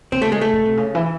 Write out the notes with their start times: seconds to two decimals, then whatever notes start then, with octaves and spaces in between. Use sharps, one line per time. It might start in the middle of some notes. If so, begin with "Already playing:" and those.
0.12 C#3 C4
0.22 A3
0.32 G#3
0.41 A3
0.53 C#3
0.66 C3
0.77 C#3
0.95 E3